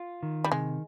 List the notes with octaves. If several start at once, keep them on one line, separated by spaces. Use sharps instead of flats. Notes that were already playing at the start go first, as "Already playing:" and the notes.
Already playing: F4
D#3
G3
C3 G#3